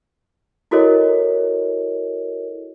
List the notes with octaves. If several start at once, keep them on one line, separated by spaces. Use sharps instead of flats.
E4 F#4 A4 A#4 C#5 D#5